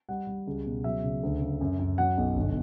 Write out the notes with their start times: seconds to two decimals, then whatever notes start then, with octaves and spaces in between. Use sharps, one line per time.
0.09 G3 F#5
0.27 G3
0.47 C#2
0.65 B2
0.84 F#3 E5
1.04 C#3
1.23 D2
1.41 C#3
1.61 F#2
1.79 F#2
1.98 F#3 F#5
2.17 B1
2.36 G1